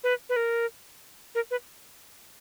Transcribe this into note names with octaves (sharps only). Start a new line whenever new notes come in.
B4
B4
A#4
A#4
B4